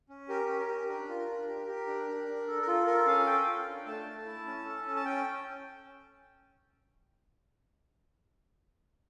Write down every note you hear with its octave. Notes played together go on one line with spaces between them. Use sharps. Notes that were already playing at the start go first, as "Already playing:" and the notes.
C#4
G4 A#4
C#4
A#4
G4
D4 A#4
F4
A#4
D4
G4
G4
D4
D4
D4
A4
A#4
F4 A4
A4 A#4
C#4 F5
A4 G5
F4
D4
A3 A5
A3
E4
C#4
A4
C#4
A5
C#4 G5